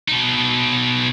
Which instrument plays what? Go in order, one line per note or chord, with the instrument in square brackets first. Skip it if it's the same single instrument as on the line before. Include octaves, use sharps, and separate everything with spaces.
[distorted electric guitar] B2 D#4